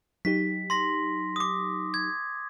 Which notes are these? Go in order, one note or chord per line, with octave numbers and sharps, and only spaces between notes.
F#3 D#4 G4 B6
C6 A#6
D6 D#6
G#6